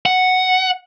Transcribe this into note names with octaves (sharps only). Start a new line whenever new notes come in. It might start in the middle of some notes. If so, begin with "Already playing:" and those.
F#5